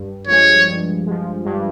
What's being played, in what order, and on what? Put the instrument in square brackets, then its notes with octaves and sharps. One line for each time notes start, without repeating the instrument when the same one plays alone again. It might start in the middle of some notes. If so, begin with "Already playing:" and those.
Already playing: [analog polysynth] G2
[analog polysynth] F3 G#3 [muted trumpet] C#5
[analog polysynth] G2
F3 G#3
G2